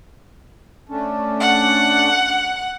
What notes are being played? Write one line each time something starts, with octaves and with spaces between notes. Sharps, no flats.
A3 C#4 D4
F#5